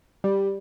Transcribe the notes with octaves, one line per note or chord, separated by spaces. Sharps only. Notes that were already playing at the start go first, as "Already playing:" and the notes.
G3